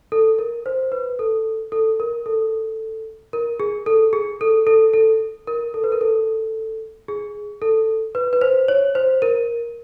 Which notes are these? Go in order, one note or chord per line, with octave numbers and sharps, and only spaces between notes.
A4
A#4
C5
B4
A4
A4
A#4
A4
A#4
G#4
A4
G#4
A4
A4
A4
A#4
A4
B4
A#4
A4
G#4
A4
B4
B4
C5
C#5
C5
A#4